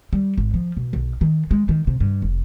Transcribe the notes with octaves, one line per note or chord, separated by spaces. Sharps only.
G3
G#1
F3
B2
B1
D#3
G#3
D#3
C3
G2
F1